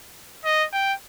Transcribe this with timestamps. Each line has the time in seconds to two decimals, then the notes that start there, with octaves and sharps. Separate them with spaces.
0.44 D#5
0.73 G5